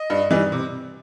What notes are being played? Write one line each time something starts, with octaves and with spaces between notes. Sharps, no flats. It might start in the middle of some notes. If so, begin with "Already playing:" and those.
Already playing: D#5
G2
E3 G3 D#4
C3